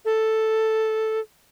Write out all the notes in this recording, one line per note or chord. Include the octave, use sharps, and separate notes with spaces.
A4